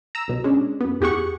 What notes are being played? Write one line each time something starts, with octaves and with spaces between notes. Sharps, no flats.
A#5 E6
C2 B2 F#3
G#3 C#4 D4
F#2 B3
E2 G4 G#4 F#5 C#6